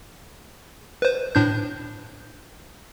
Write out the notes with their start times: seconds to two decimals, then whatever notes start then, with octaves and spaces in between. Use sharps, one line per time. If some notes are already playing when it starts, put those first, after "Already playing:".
1.02 B4 C5
1.35 A2 D4 G6